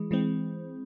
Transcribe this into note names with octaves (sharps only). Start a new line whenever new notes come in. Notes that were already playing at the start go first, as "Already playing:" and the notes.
Already playing: E3 G#3
E3 G#3 C4